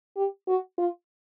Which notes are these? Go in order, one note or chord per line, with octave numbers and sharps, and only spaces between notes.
G4
F#4
F4